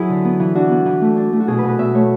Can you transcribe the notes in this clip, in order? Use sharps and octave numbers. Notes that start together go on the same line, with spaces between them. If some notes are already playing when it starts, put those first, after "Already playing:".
Already playing: F#3 E4 G#4 B4
D3
B3
E3
D4 F#4
B3
E3
A3
D4
A3
F#4
B2 G#4
B2 B4
B4
B2 E5
A3 C#5